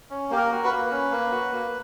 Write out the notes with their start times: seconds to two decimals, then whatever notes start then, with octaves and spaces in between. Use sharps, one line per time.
0.10 C#4
0.30 A#3 G4
0.36 A#4
0.51 F#4
0.64 B4
0.71 A#3
0.91 C#4
1.11 A#3
1.32 F#4
1.52 A#3